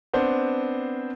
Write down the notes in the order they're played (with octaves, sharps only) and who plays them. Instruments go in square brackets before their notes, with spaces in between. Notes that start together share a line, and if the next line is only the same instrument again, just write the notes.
[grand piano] B3 C4 D4 C5